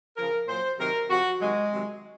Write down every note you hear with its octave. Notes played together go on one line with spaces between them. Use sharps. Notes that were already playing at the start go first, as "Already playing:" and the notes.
C#3 F3 A#4
A#2 F#3 C5
C3 D#3 F#3 A#4
C3 F3 F#4
C3 D#3 F#3 G#3
C3 D#3 F#3